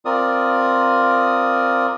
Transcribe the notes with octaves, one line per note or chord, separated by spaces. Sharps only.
C4 F4 A#4 D5 D#6